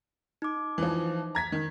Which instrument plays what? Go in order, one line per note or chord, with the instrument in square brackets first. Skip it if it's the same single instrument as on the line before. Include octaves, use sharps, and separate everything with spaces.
[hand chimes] D#4 D6
[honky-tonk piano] E3 F3
A#5 G#6 B6
D#3